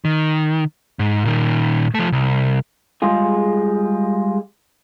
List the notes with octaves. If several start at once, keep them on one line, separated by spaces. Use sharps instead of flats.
D#3
G#2
A#2 D#3
F3 A3
C2
G3 G#3 F4 G#4